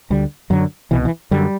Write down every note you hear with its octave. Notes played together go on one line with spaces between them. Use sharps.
D2 D3 G3
F#2 D3 F#3
C2 B2 E3
E3
F#2 D3 G3